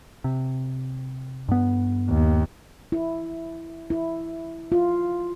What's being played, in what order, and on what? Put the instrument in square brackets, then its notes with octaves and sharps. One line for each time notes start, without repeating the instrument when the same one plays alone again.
[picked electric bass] C3
G2 B3
[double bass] D#2
[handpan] E4
E4
F4